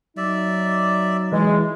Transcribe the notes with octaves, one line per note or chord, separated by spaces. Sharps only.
F#3 D#4 D5 E5
E3 G#3